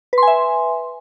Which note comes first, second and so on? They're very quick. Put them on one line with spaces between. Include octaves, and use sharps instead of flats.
B4 C6 G#5 E5